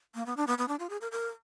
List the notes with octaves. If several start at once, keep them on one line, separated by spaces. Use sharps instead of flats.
A#3
B3
D4
B3
B3
D4
F4
G#4
A#4
A#4